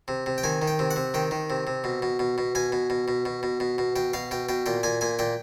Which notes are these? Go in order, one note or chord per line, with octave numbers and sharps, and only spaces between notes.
C3
C3
G5
D#3 G#5
D#3
G5
C3
F#5
C3
D#3 G5
D#3
C3
C3
B2
B2
B2
B2
B2 G#5
B2
B2
B2
B2
B2
B2
B2
B2 G5
B2 F5
B2 G5
B2 G5
A#2 G5
A#2 G#5
A#2 G#5
A#2 G5